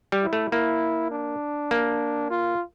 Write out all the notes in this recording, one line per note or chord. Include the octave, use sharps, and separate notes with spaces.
G3
E4
A3
A#3 E4
D4
A#3
F4